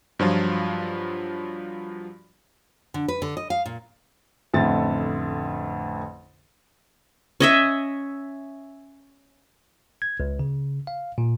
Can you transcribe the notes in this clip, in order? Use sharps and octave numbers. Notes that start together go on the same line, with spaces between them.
G2 F3 F#3 F4
D3
B4
D3
D#5
F5
A#2
A1 F2 D3 A3 A6
C#4 D#5 E5
G#6
C#2
C#3
F5
A#2